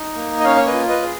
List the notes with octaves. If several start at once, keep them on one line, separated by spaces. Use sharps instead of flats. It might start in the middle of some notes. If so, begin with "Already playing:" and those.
Already playing: D#4
A#3
D#5
C#4 C#5 F5
C#5
B4 D#5
F4
B4 D#5
G#4